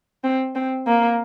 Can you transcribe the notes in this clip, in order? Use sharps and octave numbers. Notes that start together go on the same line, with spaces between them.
C4
C4
A#3